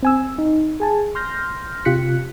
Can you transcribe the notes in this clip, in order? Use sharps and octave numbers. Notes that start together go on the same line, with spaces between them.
C4 G#5 E6
D#4
G#4 G#5 A5
C6 F6 G6 A#6
C3 F4 G4 F#6 B6 C#7